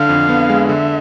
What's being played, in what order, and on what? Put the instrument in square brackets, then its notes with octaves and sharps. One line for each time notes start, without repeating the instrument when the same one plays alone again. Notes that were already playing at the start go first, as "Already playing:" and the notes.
Already playing: [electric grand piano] D3 [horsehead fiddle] F5
[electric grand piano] F2
B3
G#3
[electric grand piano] D3 [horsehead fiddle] E5